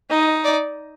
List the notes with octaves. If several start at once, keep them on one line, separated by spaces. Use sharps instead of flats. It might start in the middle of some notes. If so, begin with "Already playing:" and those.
D#4 D#5
D5